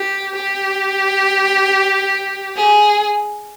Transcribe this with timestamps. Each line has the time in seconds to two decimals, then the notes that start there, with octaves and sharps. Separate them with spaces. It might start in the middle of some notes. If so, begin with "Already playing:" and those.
Already playing: G4
0.36 G4
2.56 G#4